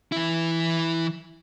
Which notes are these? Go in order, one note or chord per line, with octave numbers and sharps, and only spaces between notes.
E3 E4